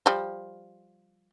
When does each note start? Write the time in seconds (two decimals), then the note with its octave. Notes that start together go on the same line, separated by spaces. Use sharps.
0.06 F3 G3